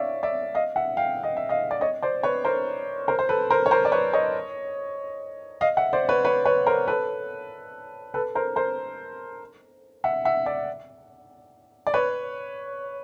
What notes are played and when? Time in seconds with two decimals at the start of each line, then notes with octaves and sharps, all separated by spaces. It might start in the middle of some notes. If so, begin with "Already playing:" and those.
Already playing: C#5 D5 E5 F5
0.23 D5 E5
0.55 D#5 F5
0.76 E5 F#5
0.97 F5 G5
1.23 D#5
1.37 E5
1.49 D#5 F5
1.71 D5
1.81 C#5 D#5
2.02 C5 D5
2.23 B4 C#5
2.45 A#4 C5
3.08 A#4 C5
3.19 C5
3.29 A4 B4
3.50 A#4 C5
3.66 C#5
3.71 A#4 C5
3.85 D5
3.92 B4 C#5
4.13 C#5 D#5
5.61 D#5 F5
5.77 E5 F#5
5.93 C5 D5
6.09 B4 C#5
6.25 B4 C#5
6.45 B4 C#5
6.67 A#4 C5
6.88 A4 B4
8.14 A4 B4
8.35 A#4 C5
8.56 A#4 C5
10.04 E5 F#5
10.25 E5 F#5
10.46 D5 E5
11.87 D5
11.94 B4 C#5